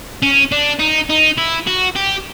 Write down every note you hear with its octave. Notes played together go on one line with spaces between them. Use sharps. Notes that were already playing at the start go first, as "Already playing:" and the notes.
C#4
D4
D#4
D#4
E4
F#4
G4